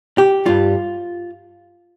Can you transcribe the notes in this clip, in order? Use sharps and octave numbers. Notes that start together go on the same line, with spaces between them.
G4
G2 G3 F4